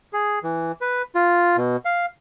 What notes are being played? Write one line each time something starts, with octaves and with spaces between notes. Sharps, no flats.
G#4
E3
B4
F4
B2
F5